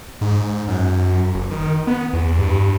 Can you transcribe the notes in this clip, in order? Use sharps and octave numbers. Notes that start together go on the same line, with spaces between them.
G#2
F#2
F#1
D#3
B3
E2
G2